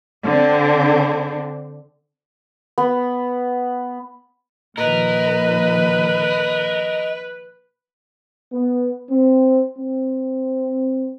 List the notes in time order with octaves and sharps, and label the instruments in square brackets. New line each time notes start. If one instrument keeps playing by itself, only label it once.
[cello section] D3 C4
[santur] B3
[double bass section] A#2 D#3 F3 [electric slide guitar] A#4 [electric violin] B4 [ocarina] D#5
[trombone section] B3
C4
C4